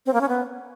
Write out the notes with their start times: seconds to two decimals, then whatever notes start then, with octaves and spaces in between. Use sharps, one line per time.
0.06 C4
0.13 A#3
0.21 C#4
0.28 B3